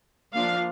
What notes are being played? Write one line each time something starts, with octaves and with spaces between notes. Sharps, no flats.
F3 A#3 D4 F5